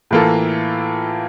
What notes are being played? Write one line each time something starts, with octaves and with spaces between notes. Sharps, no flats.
A2 E3 A#3 F4 A4